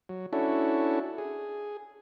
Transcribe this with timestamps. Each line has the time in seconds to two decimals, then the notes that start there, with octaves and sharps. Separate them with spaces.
0.09 F#3
0.33 C#4 D4 E4 F#4 A4
1.18 G#4